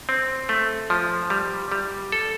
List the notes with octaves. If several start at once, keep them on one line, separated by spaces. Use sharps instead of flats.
C4
A3
F3
G3
G3
A4